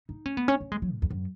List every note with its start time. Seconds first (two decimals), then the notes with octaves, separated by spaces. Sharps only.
0.09 D#4
0.26 C#4
0.37 B3
0.48 C#4
0.60 C#4
0.72 G#3
0.82 F#3
0.93 A2
1.02 E2
1.10 F#2